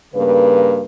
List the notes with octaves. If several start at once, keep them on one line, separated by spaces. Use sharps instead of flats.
G2 C#3 A#3 B4